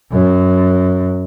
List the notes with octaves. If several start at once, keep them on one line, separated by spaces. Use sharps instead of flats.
F#2